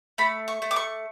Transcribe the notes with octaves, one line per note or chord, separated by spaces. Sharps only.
A3 B5
C#6
A3
D6
C#6